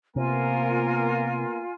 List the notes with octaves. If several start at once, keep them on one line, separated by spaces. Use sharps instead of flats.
C3 A#3 B3 F4 A#4 G#5